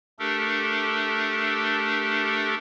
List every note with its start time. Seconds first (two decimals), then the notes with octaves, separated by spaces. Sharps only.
0.19 A3 D4 G4 A4 A#4